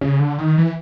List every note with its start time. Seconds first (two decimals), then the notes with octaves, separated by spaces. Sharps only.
0.01 C#3
0.19 D3
0.38 D#3
0.57 E3